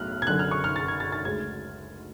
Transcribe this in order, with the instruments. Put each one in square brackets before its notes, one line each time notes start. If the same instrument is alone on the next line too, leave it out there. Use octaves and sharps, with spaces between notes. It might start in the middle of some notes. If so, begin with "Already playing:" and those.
Already playing: [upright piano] B1 A2 F6 F#6
G#6
F#1 F#2 D3 F#6
F6
C#6
F6
A6
G#6
A6
A6
D2 C#3 G#3 G#6